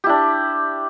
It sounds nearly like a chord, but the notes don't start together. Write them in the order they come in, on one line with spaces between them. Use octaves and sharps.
G4 E4 D4